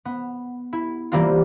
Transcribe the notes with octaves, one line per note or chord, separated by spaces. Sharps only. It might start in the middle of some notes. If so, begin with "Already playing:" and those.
B3
E4
E3 G3 A#3 C4 F4